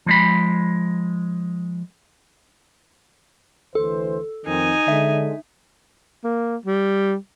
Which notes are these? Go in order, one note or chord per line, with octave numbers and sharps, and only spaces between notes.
F3 G#3 B5
D2 E3 A4 C5
F2 D#3 C4 D#4 G#5
D3 G#3 E5
A#3
G3